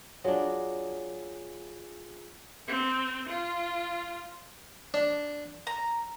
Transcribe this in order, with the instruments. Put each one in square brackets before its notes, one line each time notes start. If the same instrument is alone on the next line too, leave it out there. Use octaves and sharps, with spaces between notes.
[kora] F#3 D4 [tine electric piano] F4 G#4
[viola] C4
F4
[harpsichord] D4
[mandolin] A#5